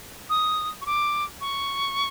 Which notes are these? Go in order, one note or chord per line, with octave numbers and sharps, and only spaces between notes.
D#6
C#6
D6
C#6